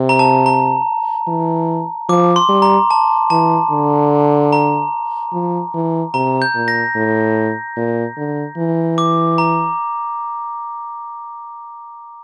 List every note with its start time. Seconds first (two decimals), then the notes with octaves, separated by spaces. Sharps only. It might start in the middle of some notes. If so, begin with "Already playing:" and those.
Already playing: C3
0.09 A#5
0.19 A5
0.46 A#5
1.28 E3
2.09 F3 D6
2.36 C6
2.49 G3
2.62 A#5
2.90 A5
3.30 E3 A5
3.71 D3
4.53 A#5
5.33 F3
5.74 E3
6.14 C3 A#5
6.42 G6
6.55 A#2
6.68 A#6
6.96 A2
7.76 A#2
8.17 D3
8.57 E3
8.98 D6
9.38 A#5